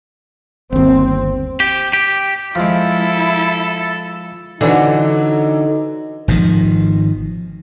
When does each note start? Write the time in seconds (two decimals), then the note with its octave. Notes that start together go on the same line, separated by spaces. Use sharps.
0.72 G1 D#2 C4
1.60 G4
1.93 G4
2.55 F3 G#3 E4 A4
4.61 D3 E3 F#3 D4 D#4
6.28 G#1 B2 D#3 F3